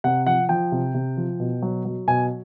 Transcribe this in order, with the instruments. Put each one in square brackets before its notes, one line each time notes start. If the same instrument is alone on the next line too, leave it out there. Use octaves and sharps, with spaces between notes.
[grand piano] C3 F#5
F3 F#5
F3 G5
C3
C3
F3
B2
F#3
F#3
B2 G#5